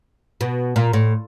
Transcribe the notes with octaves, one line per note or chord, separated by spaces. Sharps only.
B2
A#2
A2